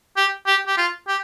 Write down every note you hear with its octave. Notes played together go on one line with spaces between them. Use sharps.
G4
G4
G4
F4
G4